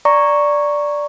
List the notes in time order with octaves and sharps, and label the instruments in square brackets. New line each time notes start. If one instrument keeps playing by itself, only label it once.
[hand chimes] D5 A#5 C#6